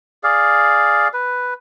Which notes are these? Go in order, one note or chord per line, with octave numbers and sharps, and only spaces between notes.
G#4 D5 F5
B4